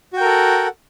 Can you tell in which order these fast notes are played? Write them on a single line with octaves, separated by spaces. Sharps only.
F#4 G5 A#4 A4 F#5